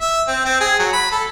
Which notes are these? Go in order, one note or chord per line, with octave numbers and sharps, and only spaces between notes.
E5
C4
C4
G#4
F#3
B5
A4